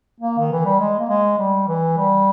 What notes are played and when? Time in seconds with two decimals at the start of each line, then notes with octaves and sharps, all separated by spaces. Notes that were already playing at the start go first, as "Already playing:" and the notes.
0.21 A#3
0.38 D#3
0.52 E3
0.65 G3
0.79 G#3
1.00 A#3
1.09 G#3
1.38 G3
1.68 E3
1.97 G3